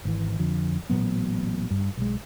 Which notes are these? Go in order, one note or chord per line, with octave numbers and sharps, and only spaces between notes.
G#1 E3
F2 D3 F3
A1 A#2 F#3 B3
G2
B1 G#3